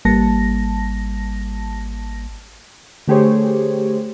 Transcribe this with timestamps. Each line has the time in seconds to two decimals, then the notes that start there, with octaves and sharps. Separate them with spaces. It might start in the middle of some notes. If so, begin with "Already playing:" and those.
0.05 G#1 G3 A#3 A5 A#6
3.07 D3 A3 G4 G#4 C5 C#5